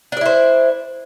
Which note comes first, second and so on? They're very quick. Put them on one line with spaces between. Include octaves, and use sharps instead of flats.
D4 D5 E4 C5